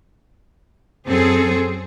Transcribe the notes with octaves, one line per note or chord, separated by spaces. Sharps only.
F#2 C4 G#4 A4 C5